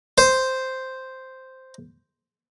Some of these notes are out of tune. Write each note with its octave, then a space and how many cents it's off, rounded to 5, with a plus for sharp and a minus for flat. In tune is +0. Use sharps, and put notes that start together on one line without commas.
C5 -5